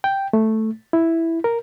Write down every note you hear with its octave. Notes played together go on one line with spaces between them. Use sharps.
G5
A3
E4
A#4